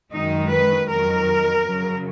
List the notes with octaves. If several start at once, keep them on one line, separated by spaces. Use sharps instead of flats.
F#2 D#3 G#3 D#4
B4
F2 D#3 F#3 A#4
F#2 C#3 F#3